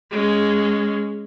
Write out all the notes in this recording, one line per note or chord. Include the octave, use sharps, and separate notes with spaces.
G#3 C#4